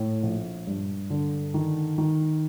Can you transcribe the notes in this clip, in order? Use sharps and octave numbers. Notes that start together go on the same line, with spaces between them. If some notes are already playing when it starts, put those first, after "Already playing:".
Already playing: A2
A#1
G2
D3
D#3
D#3